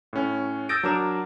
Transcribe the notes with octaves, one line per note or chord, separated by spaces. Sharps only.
A2 C#4
D#6 E6 G6 A6 A#6 D7
F#3 D4 A#4 D6 E7